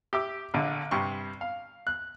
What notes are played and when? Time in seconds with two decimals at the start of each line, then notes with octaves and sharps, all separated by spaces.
0.13 G4 E5 D6
0.54 A#1 D3
0.91 G2 C3 C#6
1.41 F5
1.87 F#6